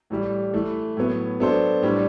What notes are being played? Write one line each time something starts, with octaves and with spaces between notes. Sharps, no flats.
A2 E3 G3
E3 A3 E4
A2 F#3 B3
F#3 B3 D4 A4 C5
A2 G3 D4